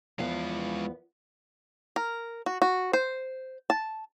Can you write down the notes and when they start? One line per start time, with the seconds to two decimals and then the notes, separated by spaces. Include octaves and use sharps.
0.19 E2 F3 G#3 B3 F5
1.96 A#4
2.46 F#4
2.62 F#4
2.93 C5
3.70 A5